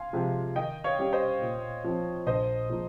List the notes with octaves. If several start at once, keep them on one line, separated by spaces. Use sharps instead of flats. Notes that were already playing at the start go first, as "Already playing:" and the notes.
Already playing: F5 G#5 C6
C3 F3 G#3 C4
D#3 D#5 G5
C#5 F5
G3 C#4 G4
C5 D#5
A#2
F3 C4
A#1 C5 D#5
A#2 F3 G#3 D#4